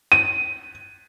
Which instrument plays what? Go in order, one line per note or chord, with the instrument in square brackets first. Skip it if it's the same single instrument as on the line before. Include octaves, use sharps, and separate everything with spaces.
[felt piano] D#7